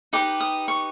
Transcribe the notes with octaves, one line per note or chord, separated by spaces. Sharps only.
D#4 G4 B4 D6
D#6
C#6